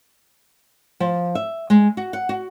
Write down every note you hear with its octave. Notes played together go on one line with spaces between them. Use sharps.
F3
E5
G#3
F#4
F#5
F#4